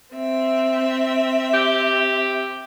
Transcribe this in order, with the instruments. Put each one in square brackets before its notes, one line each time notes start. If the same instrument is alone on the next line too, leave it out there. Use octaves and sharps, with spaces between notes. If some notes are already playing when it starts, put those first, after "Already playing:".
[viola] C4 E5
[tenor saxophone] G4